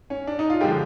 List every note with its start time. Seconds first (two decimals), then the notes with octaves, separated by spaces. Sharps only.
0.10 C#4
0.27 D4
0.39 D#4
0.50 F4
0.61 D3 F3 G#3 G4